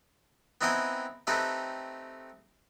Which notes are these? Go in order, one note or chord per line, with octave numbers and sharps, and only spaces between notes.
B3 C4 D#4 E4 G5 G#5
A3 C4 D#4 G4 A4 B4